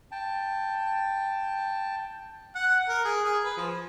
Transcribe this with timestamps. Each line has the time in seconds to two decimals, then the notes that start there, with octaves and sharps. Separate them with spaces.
0.11 G5 A5
2.55 F#5
2.89 A#4
3.05 G#4
3.24 G#4
3.44 B4
3.57 F3